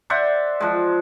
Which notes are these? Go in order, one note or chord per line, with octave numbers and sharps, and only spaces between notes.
C5 D5 E5 F#5
F3 G#3